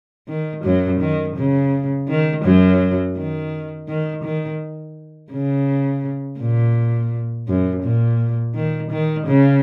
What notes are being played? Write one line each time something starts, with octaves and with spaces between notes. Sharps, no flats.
D#3
F#2 F#3
D#3
C#3
D#3
F#2 F#3
D#3
D#3
D#3
C#3
A#2
F#2
A#2
D#3
D#3
C#3